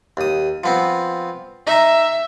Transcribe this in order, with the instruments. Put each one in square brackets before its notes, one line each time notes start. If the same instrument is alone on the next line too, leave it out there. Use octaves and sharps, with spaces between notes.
[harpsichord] D#2 D#6
F3 B3 C4
[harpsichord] D#4 A#5 [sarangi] E5